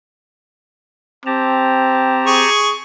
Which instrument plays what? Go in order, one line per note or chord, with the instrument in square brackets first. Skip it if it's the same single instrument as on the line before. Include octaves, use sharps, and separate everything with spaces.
[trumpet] C4 [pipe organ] G4 A5 A#5
[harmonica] G#4 C#6